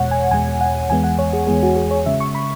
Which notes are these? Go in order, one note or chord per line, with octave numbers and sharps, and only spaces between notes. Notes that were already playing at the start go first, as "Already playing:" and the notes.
Already playing: E2 B2 G#3 C#5 F#5
G#5
E2 B2 G#3 G#5
F#5
E2 E3 G#3 B3 G#5
F#5
C#5
G#4
E2 E3 G#3 B3 G#4
F#4
G#4
C#5
C#3 G#3 C#4 E5
C#6
B5